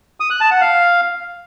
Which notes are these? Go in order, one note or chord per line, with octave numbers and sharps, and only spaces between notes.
D#6
F#6
A5
F#5
F5